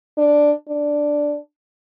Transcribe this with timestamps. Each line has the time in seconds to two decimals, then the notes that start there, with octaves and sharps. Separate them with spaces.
0.18 D4
0.69 D4